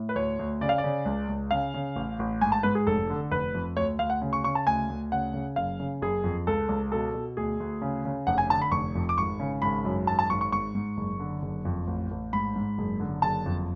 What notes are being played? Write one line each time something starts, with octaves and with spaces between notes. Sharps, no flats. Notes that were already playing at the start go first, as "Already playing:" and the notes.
Already playing: A2
B4
D2 C#5
D2
C#3 D5
F5
D5
C#3
C#2
C#2
C#3 F5
C#3
A1
A1
G#2 G#5
A5
G#2 B4
G#4
F1 A4
D3
F1 B4
F2
D2 C#5
D2 F5
F#5
C#3
C#6
C#3 C#6
A5
D2 G#5
D2
C#3 F#5
C#3
F#1 F5
C#3
F#1 G#4
F2
C#2 A4
C#2
B2 A4
B2
D2 G#4
D2
C#3
C#3
F1 F#5
G#5
D3 A5
B5
F1 C#6
F2
D6
G#1 C#6
C#3
G#1 B5
F#2
G#1 A5
A5
G#1 C#6
C#6
G#2 C#6
G#2
F#1
D3
F#1
F2
A1
A1
G#2 B5
G#2
F#1
D3
F#1 A5
F2